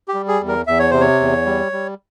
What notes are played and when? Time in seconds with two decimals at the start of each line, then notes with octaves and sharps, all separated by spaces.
0.08 G4
0.14 G3
0.28 G#4
0.41 E2
0.48 A#4
0.67 E2 E5
0.79 C#5
0.90 C3 C5
1.01 C#5
1.20 E2
1.46 G3
1.72 G3